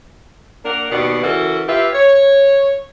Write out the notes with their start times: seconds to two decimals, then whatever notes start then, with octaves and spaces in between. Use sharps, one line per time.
0.64 A#3 D4 A#4 F#5
0.91 D#2 B2 B3 D5
1.23 C#3 E3 F#4 A4 A#4
1.67 F4 G4 B4 E5
1.93 C#5